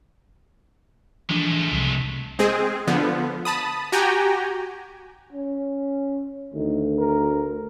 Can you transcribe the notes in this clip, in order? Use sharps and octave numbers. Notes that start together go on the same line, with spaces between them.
E3 F3 G#3 A3 D4
C2 C3
G#3 C4 G#4
D3 F3 B3
A5 B5 D#6
F#4 G4 G5 G#5 A#5
C#4
D2 D#3
A#4